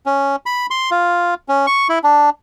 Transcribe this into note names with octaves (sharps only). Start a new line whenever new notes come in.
C#4
B5
C6
F4
C#4
C#6
E4
D4